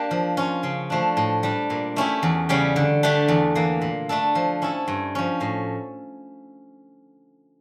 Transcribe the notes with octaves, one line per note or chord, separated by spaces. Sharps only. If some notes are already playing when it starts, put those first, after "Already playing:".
Already playing: A#3 D4 G4
F3
C#4 F4
C#3
F3 A3 D4
A2
G3 D4
A#2
A3 C#4 E4 G4
E2
C#3 G3 C#4 G4
D3
A3 D4 G4
E2
E3 A#3
A#2
A3 D4 A4
F3
C#4 E4 A4
G2
F3 C#4
A2